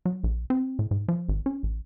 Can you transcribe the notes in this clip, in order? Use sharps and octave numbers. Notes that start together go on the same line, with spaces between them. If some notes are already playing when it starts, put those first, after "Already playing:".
F#3
A#1
C4
A2
G#2
F3
G#1
C#4
A1